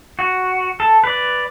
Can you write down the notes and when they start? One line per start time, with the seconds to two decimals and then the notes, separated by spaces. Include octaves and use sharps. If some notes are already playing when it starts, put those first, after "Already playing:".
0.19 F#4
0.80 A4
1.04 B4 D5